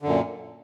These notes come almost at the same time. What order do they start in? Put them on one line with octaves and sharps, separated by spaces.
D3 F#2 A#2